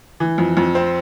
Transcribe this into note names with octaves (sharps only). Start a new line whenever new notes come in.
E3
F2
F2
C4